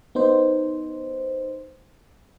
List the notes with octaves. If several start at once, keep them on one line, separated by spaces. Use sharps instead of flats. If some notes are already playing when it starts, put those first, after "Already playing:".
B3 D#4 C5